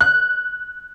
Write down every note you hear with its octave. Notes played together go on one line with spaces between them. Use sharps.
F#6